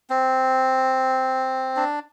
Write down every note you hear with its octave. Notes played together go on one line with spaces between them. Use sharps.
C4
D4